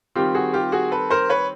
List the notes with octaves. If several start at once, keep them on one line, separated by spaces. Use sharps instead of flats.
D#3 G3 C4 F4 G4
F#4 G#4
F4 G4
F#4 G#4
A4 B4
A#4 C5
B4 C#5